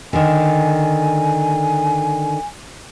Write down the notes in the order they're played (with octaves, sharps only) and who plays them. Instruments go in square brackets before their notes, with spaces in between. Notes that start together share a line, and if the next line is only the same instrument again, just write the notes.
[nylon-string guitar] D3 D#3 [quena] G#5